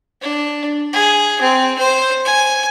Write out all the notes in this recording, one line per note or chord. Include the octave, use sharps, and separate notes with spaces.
D4
G#4
C4
C5
G#5